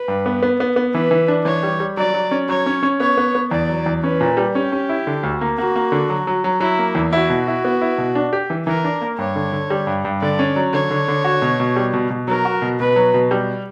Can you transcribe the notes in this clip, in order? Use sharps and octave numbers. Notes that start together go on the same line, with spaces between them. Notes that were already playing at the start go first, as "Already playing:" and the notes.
Already playing: B4
G2
B3
B3
B3
B3
E3 B4
E3
D4
E3 C#5
G3
G3
F#3 D5
F#3
C#4
F#3 C#5
C#4
C#4
B3 C#5
B3
B3
E2 D5
F#3
E2
C#4 B4
A#2
G3
C#4 G4
C#4
E4
D3
D2
A#3
A#3 F#4
A#3
D3
F#3
F#3
F#3
F#3 E4
A#3
E2
E4 F#4
B2
E4
B3
E4
B2
D4
G4
E3
E3 A#4
D4
A#3
G2 C#5
D3
D3
G3
G2
G2
D3 D5
C#4
F#3
D3 C#5
D3
D3
F#4
B2
B2
G3
B2
B2
F#3 A#4
F#4
B2
B2 B4
F#3
B2
G3